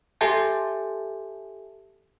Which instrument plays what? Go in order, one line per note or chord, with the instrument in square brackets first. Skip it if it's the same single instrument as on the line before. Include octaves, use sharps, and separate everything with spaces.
[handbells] G4 A4 E5 G#5 A5 G6